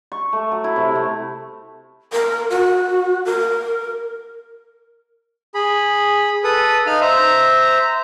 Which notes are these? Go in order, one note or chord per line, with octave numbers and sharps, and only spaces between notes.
C#6
A3
F#3
E4
C3
A3
A#4
F#4
A#4
G#4 B5
A4 B4 D#6
D#4 F5 F6
C5 E5 A#5